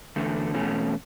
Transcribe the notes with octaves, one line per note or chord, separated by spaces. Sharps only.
E2 D3 A3
E2 B2 A3 C#4